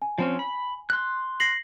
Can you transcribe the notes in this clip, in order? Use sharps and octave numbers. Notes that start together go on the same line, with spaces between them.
G#5
F3 C4 C#4
B5
C6 F#6
A#6 C7 F#7